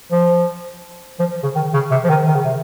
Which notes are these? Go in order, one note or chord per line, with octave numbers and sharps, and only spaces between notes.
F3
F3
C#3
D#3
C#3
C3
F3
D#3
D#3
C#3
C3